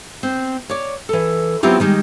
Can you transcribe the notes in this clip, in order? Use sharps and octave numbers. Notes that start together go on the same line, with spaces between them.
C4
C#5 D5
E3 A4
F#3 B3 C4 E4 F4 G4
D#3 G3 G#3